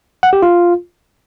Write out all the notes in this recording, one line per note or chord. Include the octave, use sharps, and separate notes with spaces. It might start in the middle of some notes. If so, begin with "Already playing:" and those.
F#5
G4
F4